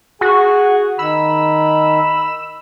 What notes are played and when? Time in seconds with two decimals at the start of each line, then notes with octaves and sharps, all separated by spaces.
0.21 F#4 G#4 G#5
0.99 D#3 B5 E6